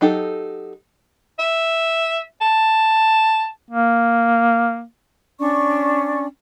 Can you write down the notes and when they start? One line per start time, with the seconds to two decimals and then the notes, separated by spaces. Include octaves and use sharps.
0.01 F#3 D#4 G4 A4
1.39 E5
2.41 A5
3.70 A#3
5.39 C#4 D4 D5 C#6